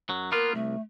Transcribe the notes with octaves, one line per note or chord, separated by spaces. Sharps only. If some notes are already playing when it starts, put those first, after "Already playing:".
F#2 F#3
A#3 B3 F4 A#4
C2 A3